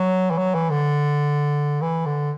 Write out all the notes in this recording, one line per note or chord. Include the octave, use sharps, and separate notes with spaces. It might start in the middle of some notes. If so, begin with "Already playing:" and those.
Already playing: F#3
E3
F#3
E3
D3
E3
D3